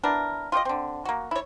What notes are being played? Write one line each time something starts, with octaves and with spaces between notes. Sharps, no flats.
B3 D4 E4 A#4
F4 G4 C5 D#5
D3 C4
A#3 F#4
E4 C#5